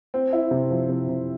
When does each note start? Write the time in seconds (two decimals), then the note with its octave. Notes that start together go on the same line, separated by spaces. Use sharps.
0.14 C4
0.33 E4
0.51 C3
0.70 F3
0.89 C3
1.09 C3